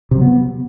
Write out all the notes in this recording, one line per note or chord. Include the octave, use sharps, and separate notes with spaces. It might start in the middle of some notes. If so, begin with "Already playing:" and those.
C3
F#3
B3